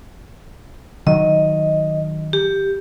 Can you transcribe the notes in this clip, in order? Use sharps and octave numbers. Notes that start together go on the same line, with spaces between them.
D#3 F#3 D#5
G4